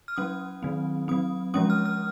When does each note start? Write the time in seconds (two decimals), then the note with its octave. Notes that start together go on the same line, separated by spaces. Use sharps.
0.08 F6
0.16 F#3 C#4 D#6
0.63 D#3 F#3 C4
1.08 F#3 C4 D#6
1.54 F3 G#3 C#4 D#6
1.70 F6
1.86 F6